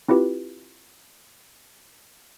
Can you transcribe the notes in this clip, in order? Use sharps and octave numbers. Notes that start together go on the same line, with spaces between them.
C4 E4 F4 G4 B4